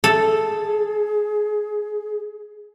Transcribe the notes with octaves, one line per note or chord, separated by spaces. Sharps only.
G#4 A4